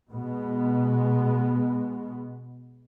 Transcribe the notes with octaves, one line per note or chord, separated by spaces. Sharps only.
B2 G#3 B3